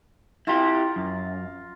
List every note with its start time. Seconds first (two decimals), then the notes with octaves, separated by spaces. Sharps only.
0.47 E4 F4 G4 A#5
0.96 F#2